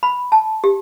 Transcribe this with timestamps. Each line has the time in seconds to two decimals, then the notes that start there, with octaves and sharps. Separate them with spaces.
0.03 B5
0.32 A5
0.64 G4